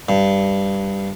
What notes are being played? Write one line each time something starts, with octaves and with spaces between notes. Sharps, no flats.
G2